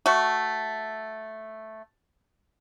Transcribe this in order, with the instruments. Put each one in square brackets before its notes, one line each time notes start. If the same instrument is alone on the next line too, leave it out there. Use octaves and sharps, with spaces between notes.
[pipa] A3 F#4